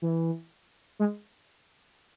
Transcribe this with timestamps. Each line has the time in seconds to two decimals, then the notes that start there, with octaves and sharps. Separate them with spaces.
0.02 E3
0.99 G#3